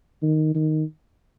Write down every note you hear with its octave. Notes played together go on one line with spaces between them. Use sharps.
D#3
D#3